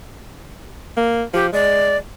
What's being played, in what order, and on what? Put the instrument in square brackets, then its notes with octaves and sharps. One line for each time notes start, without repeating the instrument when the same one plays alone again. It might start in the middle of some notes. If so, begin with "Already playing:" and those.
[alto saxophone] A#3
[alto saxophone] F3 [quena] G4
[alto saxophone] G#3 [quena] D5